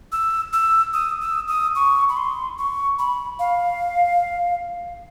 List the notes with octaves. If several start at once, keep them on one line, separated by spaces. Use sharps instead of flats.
E6
E6
D#6
E6
D#6
C#6
B5
C6
C#6
B5
F5